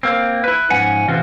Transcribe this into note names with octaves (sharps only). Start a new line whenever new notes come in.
A#3 C4
E4 B4
G#2 F3 C#4 F#5 G#5
A2 C3 E3 F4 F#4